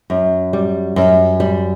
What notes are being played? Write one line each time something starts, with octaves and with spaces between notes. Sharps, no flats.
F#2
G3
F#2
G3